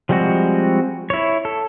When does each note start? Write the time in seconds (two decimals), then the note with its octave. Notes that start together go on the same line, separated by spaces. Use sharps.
0.09 F3 G3 G#3 C4 F#4
1.10 E4 C#5
1.45 A4